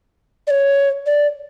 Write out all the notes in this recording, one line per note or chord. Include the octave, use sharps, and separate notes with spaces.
D5
C#5
D5